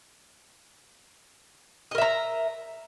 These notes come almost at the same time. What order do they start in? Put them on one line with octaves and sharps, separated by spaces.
D#5 A#4 E5 A#5